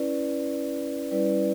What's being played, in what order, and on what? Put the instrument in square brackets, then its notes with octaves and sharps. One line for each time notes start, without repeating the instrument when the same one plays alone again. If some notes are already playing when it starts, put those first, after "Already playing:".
Already playing: [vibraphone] C#4 E4 B4 D5
G3 C#4 E4 B4 D5